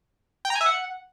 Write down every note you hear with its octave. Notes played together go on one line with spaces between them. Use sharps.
G5
A#5
G#5
E5
F#5